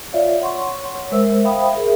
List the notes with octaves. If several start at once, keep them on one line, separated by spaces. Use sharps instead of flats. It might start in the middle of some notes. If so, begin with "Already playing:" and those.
F4 C#5 D5 E5 F5
C#5 F#5 C6 C#6
C#5
G#3 A#4 C5 E5 E6
C5 E5 F5 G5 B5 D#6
G#4 A#4 E5